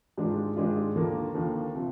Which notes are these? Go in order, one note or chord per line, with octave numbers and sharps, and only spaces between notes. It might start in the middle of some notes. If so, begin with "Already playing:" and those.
G#2 D#3 G#3 D4 F4
G#2 D#3 G#3 D4 F4
D#2 D3 F3 A#3
D#2 D3 F3 A#3
C3 F3